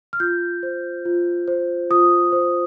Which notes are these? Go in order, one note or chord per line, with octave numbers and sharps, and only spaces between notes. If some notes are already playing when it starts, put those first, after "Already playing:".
F6
F4 G6
C5
F4
C5
F4 D#6
C5